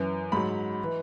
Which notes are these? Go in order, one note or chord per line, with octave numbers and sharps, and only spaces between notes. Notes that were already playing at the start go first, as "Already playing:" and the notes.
Already playing: F#2 E3
G#2 F#3 B5
E3